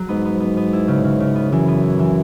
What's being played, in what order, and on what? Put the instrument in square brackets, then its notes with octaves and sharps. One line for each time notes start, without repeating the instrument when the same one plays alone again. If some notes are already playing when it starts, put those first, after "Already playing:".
Already playing: [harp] F#3
[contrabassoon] G#2 [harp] B3
[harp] B3
B3
B3
E4
C#3
C#3
C#3
B3
[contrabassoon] F#2 [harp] E3
[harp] B3
E4
E3